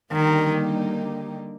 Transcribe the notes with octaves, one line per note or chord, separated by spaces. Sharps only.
D3 D#3 G3 A#3 D#4 G4